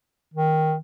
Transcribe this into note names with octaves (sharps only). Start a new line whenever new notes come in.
D#3